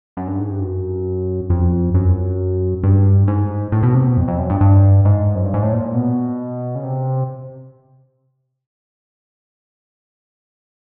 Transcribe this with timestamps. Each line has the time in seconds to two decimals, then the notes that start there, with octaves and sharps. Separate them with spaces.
0.17 F#2
0.28 G2
0.39 G#2
0.50 G2
0.61 F#2
1.50 F2
1.94 F#2
2.84 G2
3.28 G#2
3.72 A2
3.83 B2
3.94 C3
4.06 B2
4.17 F2
4.28 F2
4.39 F#2
4.50 G2
4.61 G2
5.05 G#2
5.35 F#2
5.45 G2
5.54 G#2
5.63 A2
5.73 A#2
5.94 B2
6.75 C#3
6.84 C3